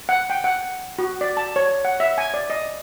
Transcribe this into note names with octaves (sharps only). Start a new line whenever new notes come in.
F#5
G5
F#5
F#4
D5
A5
C#5
F#5
E5
G#5
D5
D#5